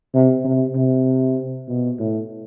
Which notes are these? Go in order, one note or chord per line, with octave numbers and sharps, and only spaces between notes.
C3
C3
C3
B2
A2